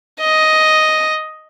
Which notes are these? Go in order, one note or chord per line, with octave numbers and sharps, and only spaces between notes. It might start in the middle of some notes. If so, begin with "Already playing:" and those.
D#5